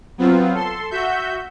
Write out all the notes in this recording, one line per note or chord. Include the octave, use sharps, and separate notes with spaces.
F#3 B3 C4 F4
A4 C6
F#4 E5 G6